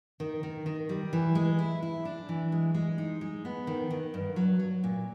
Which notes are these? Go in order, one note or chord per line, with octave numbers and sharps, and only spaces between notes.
D#3
D#3
D#3
G3
E3
G#3
E4
E4
D4
E3
G#3
G#3
D#4
G#3
B3
D#3
D#3
G2
F#3
F#3
A#2